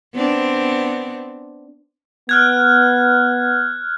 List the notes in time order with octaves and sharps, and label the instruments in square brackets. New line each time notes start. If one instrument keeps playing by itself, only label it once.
[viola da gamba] B3 C4 D4
[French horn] B3 [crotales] F6 F#6 G#6